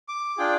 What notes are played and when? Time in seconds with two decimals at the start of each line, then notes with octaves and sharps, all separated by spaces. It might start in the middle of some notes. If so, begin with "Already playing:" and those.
0.08 D6
0.37 D4 F4 G#4 G5